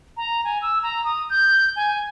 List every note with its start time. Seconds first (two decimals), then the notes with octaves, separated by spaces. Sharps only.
0.17 A#5
0.45 G#5
0.62 E6
0.83 A#5
1.05 D#6
1.30 G6
1.76 G#5